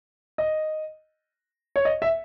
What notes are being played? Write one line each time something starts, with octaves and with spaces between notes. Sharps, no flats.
D#5
C#5
D#5
E5